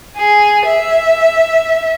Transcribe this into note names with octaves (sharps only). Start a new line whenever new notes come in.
G#4
E5